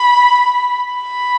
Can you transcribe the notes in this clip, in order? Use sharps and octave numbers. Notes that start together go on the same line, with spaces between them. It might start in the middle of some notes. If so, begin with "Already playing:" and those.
Already playing: B5
B5